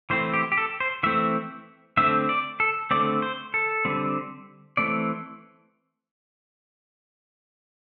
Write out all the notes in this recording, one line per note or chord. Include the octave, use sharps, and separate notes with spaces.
E3 A3 C4 C5
G4
G4
A4
C5
E3 A3 C4 E5
D3 A3 C4 E5
D5
A4
D3 A3 C4 D5
C5
A4
D3 G3 C4
E3 A3 C4 D5